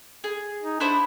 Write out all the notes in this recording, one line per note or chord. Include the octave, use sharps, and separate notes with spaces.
G#4
D#4
B3 D4 E4 C5